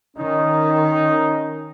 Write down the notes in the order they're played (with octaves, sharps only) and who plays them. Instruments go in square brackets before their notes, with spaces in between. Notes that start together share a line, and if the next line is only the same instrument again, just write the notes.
[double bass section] D#3 [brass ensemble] C#4 [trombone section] D#4